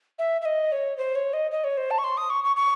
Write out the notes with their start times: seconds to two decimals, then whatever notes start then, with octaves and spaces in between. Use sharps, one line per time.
0.19 E5
0.41 E5
0.45 D#5
0.72 C#5
0.98 C5
1.15 C#5
1.33 D#5
1.51 D#5
1.64 C#5
1.77 C5
1.91 A5
1.98 C#6
2.04 C6
2.17 D#6
2.30 C#6
2.44 C#6
2.56 C#6